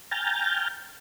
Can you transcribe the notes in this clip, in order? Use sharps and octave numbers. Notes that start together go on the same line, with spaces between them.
G5 G#5 A#5 F6 G6 A6